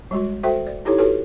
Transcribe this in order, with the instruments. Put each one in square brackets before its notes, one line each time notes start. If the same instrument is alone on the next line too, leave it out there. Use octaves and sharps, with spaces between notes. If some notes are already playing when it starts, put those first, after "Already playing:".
[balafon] G3 G#3 F#4
F#4 A4 C5 E5 G5
D5
D#4 E4 G4 A4 C#5
F#4 G4 A4 B4 C#5